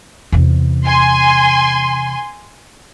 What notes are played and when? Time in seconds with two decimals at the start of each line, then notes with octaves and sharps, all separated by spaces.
0.32 E2 C3
0.87 G#5 C6